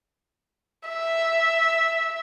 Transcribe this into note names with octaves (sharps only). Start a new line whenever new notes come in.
E5